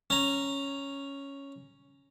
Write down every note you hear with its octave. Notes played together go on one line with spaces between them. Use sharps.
C#4 A#5